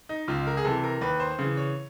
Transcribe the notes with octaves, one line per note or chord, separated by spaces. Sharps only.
D#4
C#2 F4
A#4
G#4
C3 E3 A4
A#4
D#2 B4
C5
C#3 E3
C#5